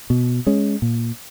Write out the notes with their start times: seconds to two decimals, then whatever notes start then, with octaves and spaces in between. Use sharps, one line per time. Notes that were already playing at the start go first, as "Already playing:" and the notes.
0.10 B2
0.47 G#3 C#4
0.82 A#2